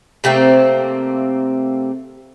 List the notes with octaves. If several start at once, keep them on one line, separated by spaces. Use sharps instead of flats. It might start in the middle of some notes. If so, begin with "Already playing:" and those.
C3 A3 A#3 C4